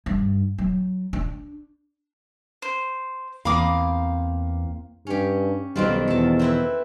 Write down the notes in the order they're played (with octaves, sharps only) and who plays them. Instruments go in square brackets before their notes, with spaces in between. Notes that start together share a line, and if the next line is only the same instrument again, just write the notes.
[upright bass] G2
F#3
D4
[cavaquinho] C5
[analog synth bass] E2 [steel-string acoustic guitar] A#3 C4 F5 [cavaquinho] B5 D6 D#6
[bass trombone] G2 [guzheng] C#4 G4
[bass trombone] B1 [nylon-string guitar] B2 D#3 G3 [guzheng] F3 C4 F4
[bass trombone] E2 [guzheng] A4 A5
[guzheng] C4 E4 B4